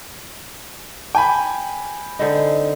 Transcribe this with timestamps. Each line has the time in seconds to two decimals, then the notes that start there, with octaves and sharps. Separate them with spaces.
1.15 G5 G#5 B5
2.19 D3 C4 D#4